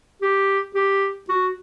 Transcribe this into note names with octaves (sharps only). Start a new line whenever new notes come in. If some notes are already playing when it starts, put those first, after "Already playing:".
G4
G4
F#4